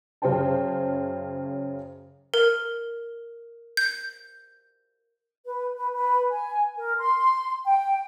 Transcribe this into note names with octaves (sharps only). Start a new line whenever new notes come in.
F#2 C#3 C#4 C5 G5 A5
A#4
G6
B4
B4
B4
G#5
A#4
C6
G5